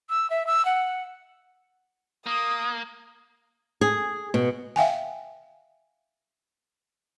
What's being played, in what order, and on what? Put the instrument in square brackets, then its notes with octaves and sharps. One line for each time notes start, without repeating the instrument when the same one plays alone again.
[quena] E6
E5
E6
F#5
[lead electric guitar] A#3 [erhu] D#6
[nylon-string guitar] G#4
B2
[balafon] E5 F5 G5 G#5